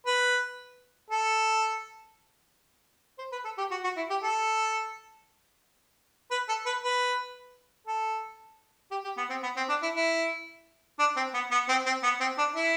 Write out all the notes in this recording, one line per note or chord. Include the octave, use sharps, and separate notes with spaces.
B4
A4
C5
B4
A4
G4
F#4
F#4
E4
G4
A4
B4
A4
B4
B4
A4
G4
G4
B3
C4
B3
C4
D4
E4
E4
D4
C4
B3
B3
C4
C4
B3
C4
D4
E4